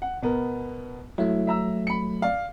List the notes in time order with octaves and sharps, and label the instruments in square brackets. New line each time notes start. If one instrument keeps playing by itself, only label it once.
[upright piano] F#5
B2 B3 A#4
[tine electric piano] F#3 A3 [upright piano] E4
[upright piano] E5 A#5 E6
B5 C#7
D5 F5